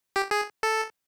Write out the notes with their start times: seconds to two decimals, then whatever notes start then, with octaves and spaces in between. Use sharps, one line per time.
0.16 G4
0.31 G#4
0.63 A4